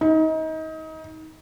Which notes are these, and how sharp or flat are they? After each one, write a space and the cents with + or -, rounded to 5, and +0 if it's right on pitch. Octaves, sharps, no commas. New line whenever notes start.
D#4 +30